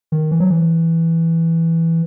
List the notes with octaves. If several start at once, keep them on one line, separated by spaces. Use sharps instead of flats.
D#3
E3
F#3
E3